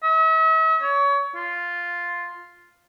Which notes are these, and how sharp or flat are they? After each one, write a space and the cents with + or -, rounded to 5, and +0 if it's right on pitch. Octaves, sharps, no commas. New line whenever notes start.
E5 -45
C#5 +25
F4 +0